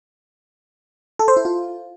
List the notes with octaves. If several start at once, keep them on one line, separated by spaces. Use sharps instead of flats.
A4
C5
E4
F4